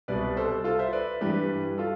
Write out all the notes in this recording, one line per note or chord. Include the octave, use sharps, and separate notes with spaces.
C2 B2 G3 B4 D5
A4 C5
F4 A4
C5 E5
B4 D5
G2 E3 G3 G4 B4
F4 A4